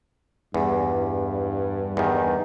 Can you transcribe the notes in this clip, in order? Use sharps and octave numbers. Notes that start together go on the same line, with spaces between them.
E2 G2
E2 D#3